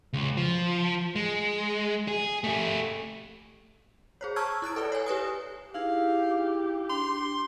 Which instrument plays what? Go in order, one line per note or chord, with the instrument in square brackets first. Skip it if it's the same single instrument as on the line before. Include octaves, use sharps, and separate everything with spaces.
[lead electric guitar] C#2
F3
G#3
G#4
A3 G4
[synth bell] G#4 C5 C#5
A5 A#5 C#6 E6 F6 G#6
E4 F#6 A6 D7
A4 B4 D5
C#5 G#5
G4 B4 G#5 D#6
[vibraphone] D#4 E4 G#4 [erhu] G4 [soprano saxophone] F5
[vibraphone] D4 [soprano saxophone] C6